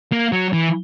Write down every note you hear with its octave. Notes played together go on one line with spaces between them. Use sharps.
A#3
F#3
E3